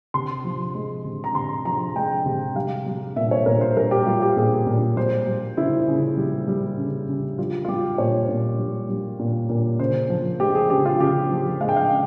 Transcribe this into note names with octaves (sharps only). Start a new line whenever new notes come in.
C3 C6
F3
G#3
C3
A#5
C3 C6
F3 A#5
G#3 G5
C3
G3 F5
G3
A#2 E5
C#5
A#2 A#4
C5
G3 A#4
G4
G3 F4
G4
A#2 G#4
A#2
G3 C5
G3
C#3 E4
C#3
G3
G3
C#3
C#3
G3 F4
F4
G3 G4
A#2 C#5
A#2
G3
G3
A#2
A#2
C#3 C5
F3
G#3 G4
G#4
C#3 G4
F4
C#3 G4
F3
G#3 F5
G5
F5
C#3